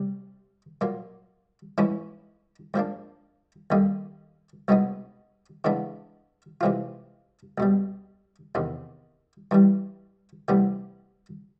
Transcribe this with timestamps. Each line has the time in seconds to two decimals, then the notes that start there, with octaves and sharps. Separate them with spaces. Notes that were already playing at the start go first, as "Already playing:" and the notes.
Already playing: C3 G3
0.81 A#2 F#3 A#3
1.78 G#2 E3 G#3 C#4 E4
2.74 G#2 F3 A#3 D4
3.70 D#2 D3 G3 A#3 D#4
4.68 C2 B2 G#3 B3 D#4
5.64 C#3 E3 G#3 B3 D4
6.61 C3 E3 G#3 C4 F4
7.58 C#2 B2 G3
8.55 E2 C3 D#3
9.51 G2 E3 G3
10.48 D2 C3 E3 G3 B3